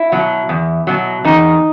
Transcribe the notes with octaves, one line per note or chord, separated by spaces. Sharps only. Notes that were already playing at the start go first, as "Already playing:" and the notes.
Already playing: E4
B2 F#3
E2
B2 F#3
E2 D#4